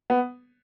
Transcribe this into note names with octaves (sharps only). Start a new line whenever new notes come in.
B3